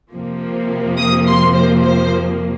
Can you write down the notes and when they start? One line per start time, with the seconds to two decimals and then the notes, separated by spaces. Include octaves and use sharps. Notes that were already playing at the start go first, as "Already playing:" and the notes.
0.13 F2 C3 F3 A#3
0.98 D#6
1.27 C6
1.55 C5
1.83 C5